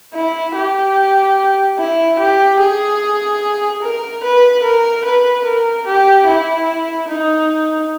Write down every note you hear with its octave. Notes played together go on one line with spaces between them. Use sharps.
E4
G4
E4
G4
G#4
A#4
B4
A#4
B4
A#4
G4
E4
D#4